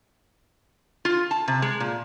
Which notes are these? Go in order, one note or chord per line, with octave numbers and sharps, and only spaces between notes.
F4
A5
C3
G#3
A#2